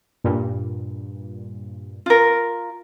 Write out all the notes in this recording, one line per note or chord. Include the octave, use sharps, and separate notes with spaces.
G2 A#2
F4 A#4